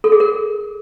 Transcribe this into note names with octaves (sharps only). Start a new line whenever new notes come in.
A4
G#4
A#4